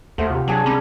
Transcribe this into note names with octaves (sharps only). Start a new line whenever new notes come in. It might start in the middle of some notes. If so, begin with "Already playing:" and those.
D#2 A3 C5 F#5
C3 F4 G4
F#3 D4 G#4
G#3 C4 C#4 A#5 B5 D6